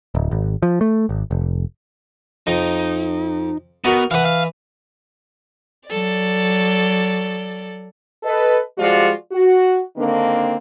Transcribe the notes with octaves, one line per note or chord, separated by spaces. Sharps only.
D1
G#1
F3
A3
G#1
F1
F2 D#4
B3 D#4 F#4 A#4
E3 B4 F5 F#5
F5
F#3 A4 D5
A4 B4 D#5
F3 G3 G#3 F4 F#4 D5
F#4
D3 D#3 A#3 C4 D4